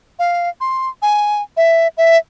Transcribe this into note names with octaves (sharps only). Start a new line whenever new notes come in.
F5
C6
G#5
E5
E5